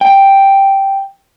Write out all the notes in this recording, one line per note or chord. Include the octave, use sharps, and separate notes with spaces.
G5